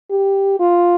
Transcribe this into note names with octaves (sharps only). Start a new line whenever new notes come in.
G4
F4